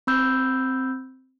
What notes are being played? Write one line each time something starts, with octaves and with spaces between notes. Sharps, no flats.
C4 B5 E6 G6